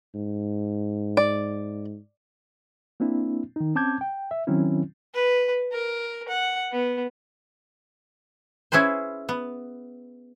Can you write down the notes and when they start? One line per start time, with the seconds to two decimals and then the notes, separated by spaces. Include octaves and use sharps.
0.15 G#2
1.17 D5
3.00 A#3 C4 D4 E4
3.56 D#3 D#4
3.75 C4 C#4 A5 D6 G6 G#6
4.01 G5
4.31 E5
4.47 D#3 F#3 C4 C#4 E4
5.14 B4
5.72 A#4
6.28 F#5
6.72 B3
8.72 C#4 E4 G#4 B4 C5
9.29 B3